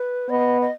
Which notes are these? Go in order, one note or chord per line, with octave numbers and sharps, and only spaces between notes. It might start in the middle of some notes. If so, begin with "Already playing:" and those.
Already playing: B4
B3 D#5
D#5